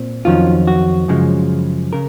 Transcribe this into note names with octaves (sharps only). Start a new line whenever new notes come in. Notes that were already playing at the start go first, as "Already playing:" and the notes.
Already playing: A#2 C4
F2 D#3 F#3 C#4 F4
F#4
F#2 C#3 F3 G#3
C#3 A#4